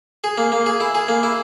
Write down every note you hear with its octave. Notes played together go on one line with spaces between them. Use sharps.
G#4
A#3
A#3
G#4
E4
G#4
A#3
E4